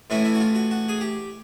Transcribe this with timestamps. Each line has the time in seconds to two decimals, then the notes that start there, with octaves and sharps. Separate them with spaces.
0.10 A2 E3 A3 C#4 E4
0.25 E4
0.35 F#4
0.40 F4
0.55 F#4
0.71 F#4
0.89 G#4
1.01 G4